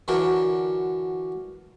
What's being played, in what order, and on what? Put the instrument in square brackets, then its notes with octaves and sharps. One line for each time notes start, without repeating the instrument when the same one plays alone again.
[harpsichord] D3 E3 F#3 D4 A#4